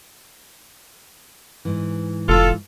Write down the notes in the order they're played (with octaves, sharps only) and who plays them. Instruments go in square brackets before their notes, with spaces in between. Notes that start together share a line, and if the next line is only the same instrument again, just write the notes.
[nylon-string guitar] G#2 E3
[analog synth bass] F1 [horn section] F4 A4